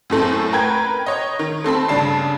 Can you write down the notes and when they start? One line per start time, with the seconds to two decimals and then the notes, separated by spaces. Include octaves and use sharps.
0.10 F#2 A2 A3 C4
0.53 A#4 B4 G5 G#6
1.06 C#5 D#5
1.39 D#3
1.64 A3 C4 A4 B5
1.88 G2 C#3 D4 A5 C7